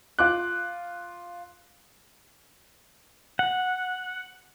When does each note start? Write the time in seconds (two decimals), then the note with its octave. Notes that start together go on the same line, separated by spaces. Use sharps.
0.19 F4 D6 F#6
3.39 F#5